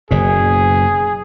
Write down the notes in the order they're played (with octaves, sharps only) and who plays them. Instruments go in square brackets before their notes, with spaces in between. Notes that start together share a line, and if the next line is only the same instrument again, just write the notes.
[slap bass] F#1 B2 [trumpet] G#4